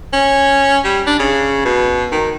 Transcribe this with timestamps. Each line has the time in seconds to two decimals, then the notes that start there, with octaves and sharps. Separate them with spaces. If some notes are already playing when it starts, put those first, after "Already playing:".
0.13 C#4
0.84 G3
1.07 D4
1.19 C#3
1.65 B2
2.12 D#3